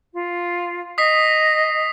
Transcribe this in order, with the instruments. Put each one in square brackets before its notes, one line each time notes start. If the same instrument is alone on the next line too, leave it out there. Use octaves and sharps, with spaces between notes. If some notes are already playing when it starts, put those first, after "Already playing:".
[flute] F4
[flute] D#5 [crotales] D#6 B6 C7